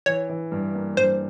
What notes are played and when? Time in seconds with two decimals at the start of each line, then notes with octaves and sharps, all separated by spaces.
0.06 E3 C#5
0.29 E3
0.52 G2
0.75 A#3
0.97 G2 C5